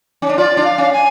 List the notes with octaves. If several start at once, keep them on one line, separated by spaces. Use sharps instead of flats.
C#4
D4
F4 D5
D4
F5
C#4
G#5